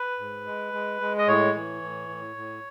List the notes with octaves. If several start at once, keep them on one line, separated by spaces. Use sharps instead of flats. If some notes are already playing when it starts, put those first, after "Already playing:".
Already playing: B4
G#2
G#3
G#3
G#3
D#5
A2 C#5
E3
A2
A2
A2